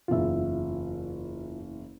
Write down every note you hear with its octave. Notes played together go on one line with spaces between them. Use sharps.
F#1 E2 F4 E5